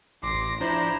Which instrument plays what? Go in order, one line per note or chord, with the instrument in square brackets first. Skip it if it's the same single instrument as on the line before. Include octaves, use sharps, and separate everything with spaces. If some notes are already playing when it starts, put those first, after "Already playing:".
[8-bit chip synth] A1 [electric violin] C6 A#6 [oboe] D6
[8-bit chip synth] F3 D4 C5 [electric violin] E4 [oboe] A#5